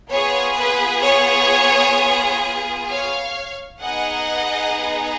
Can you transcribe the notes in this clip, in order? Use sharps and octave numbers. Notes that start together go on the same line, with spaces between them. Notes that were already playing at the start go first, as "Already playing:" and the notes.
B3 F4 G#4 C#5
B4
C#5
C#5 F5
B3 D#4 G#4 D#5 F#5